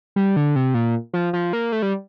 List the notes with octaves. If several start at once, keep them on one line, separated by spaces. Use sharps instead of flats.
G3
D3
C3
A#2
F3
F3
A#3
A3
G3